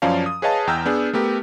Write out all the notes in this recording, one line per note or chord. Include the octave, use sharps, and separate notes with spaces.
F#2 F3 C#4 D5 F5 A5
D#6
G#4 B4 C#5 D#5 F5 A5
E2 G5 A#5 E6 F6 G6
B3 D4 G#4
A3 B3 G4 A#4